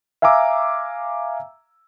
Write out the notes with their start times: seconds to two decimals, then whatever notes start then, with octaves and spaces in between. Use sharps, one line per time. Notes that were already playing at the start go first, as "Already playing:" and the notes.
0.22 E5 F5 G#5 A#5 D6 E6